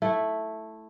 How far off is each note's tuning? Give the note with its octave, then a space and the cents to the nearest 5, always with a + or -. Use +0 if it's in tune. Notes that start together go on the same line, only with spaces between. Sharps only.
A3 +0 E4 +0